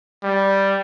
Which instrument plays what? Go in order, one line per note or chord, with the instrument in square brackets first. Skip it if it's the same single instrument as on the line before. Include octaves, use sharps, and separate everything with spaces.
[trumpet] G3